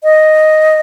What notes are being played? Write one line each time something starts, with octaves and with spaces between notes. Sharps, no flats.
D#5